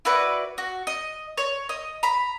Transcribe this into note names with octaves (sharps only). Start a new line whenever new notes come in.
E4 F#4 B4 D5
F#4
D#5
C#5
D#5
A#5 B5